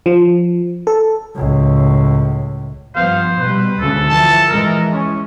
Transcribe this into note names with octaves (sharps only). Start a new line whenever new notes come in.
F3
A4
C#2 A2
G2 F3 B3 C5 F5
B2 G3 B4
D2 G#2 C#3 A4
E3 F3 A5
E3 G#3 A#4
C#4